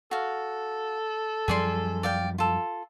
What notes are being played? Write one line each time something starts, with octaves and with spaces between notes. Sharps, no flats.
F#4 A4 F5
F#2 F3 G3 G#4 D5 C6
D5 F5 G5
F4 A4